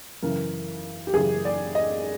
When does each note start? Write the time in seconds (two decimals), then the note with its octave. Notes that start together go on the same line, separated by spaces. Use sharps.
0.22 F#2 C#3 E3 A#4
1.07 G4
1.13 F#2 C#3 E3 G#4
1.45 D5
1.75 D#5